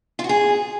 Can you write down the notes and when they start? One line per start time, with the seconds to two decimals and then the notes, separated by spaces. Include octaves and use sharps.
0.19 F4
0.24 F#4
0.29 G#4